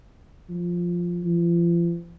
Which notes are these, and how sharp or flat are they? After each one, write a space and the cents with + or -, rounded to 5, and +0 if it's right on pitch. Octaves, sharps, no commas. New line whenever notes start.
F3 +0
F3 -40